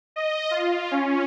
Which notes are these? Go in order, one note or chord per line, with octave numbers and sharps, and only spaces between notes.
D#5
F4
C#4